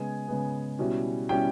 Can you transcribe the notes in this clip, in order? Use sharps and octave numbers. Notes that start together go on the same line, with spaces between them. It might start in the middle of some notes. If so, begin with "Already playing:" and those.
Already playing: C#3 G#3 B3 G#5
C#3 G#3 B3
B2 G3 C#4 E4
B2 G3 C#4 E4 G5